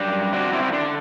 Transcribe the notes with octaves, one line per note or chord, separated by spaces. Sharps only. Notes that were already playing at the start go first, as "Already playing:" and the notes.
Already playing: F#2 G3 D4
C4 D4 F#4
C4 E4
E4
D3 D4